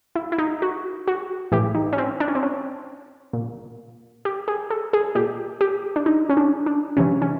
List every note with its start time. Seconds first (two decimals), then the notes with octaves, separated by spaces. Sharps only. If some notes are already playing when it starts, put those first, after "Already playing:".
0.15 E4
0.32 E4
0.38 D#4
0.62 F#4
1.07 F#4
1.52 A2 E3 G4
1.75 D#4
1.93 C#4
1.98 C4
2.20 D4
2.28 C#4
2.35 C4
2.43 C#4
3.33 A#2
4.25 G4
4.48 G#4
4.70 A4
4.93 G#4
5.15 A#2 G4
5.61 G4
5.96 D4
6.06 D#4
6.29 C#4
6.37 D4
6.66 D4
6.97 C3 E3 C#4
7.22 C#4